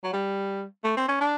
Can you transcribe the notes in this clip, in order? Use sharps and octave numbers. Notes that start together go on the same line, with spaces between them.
F#3
G3
A3
C4
C#4
D4